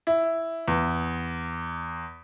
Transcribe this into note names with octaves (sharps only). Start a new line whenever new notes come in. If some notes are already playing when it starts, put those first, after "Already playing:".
E4
E2